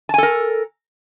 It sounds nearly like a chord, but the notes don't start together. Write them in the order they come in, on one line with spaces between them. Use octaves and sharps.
A5 G#5 A4 A#4